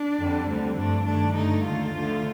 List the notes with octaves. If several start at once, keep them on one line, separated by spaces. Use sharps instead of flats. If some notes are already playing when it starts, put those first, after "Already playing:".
Already playing: D4
F2 D3 G3
D2 D3 G3 C4
G2 F3 A3 D4
G2 D#3 A3 D4
G2 D3 A3 D#4
D#2 D3 A3 F4
D2 D3 F3 A3